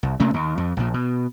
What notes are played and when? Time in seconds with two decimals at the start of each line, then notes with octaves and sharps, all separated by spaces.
0.03 C2
0.20 C3 A3 A#3 C#4
0.34 D#2
0.58 F2
0.77 A#1 A#2
0.94 B2